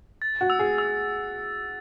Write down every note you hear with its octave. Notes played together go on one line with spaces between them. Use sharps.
A6
F#4
E6
G#4
E6